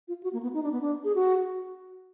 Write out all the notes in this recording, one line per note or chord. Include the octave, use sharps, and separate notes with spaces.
F4
F#4
A#3
B3
D#4
D4
B3
D4
G#4
F#4